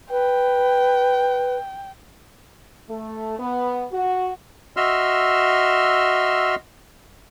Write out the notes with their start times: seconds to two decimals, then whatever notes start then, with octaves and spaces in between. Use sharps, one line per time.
0.11 B4 G5
2.89 A3
3.39 B3
3.92 F#4
4.76 F#4 D#5 E5 C6 E6 F6